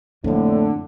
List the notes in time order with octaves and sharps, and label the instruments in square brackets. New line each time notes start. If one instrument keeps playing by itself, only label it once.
[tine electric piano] F2 [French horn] A2 [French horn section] D3 [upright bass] A3 A#3